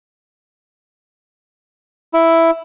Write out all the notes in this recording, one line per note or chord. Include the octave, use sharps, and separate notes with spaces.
E4